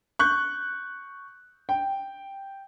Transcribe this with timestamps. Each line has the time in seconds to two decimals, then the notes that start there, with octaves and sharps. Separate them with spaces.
0.19 C#6 F#6 G6
1.69 G5